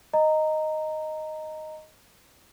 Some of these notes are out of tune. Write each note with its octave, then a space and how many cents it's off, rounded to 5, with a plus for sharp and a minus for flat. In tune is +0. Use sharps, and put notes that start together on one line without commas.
D#5 +0 A#5 -10